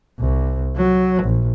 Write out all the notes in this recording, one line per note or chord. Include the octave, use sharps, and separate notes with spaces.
C2
F#3
A#1